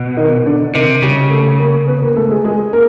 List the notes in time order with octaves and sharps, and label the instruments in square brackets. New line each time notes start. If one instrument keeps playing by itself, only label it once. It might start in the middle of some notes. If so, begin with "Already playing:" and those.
Already playing: [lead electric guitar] B2
[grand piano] D#3 D#4
D3 D4
[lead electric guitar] C3 [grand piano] D#3 D#4
[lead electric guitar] C#3 [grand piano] G3 G4
[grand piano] A3 A4
A#3 A#4
B3 B4
A#3 A#4
A3 A4
G#3 G#4
G#3 G#4
A#3 A#4